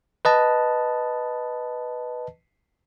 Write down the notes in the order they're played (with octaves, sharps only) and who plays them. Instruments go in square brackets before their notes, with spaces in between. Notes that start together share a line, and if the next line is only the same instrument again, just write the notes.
[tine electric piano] B4 D#5 A5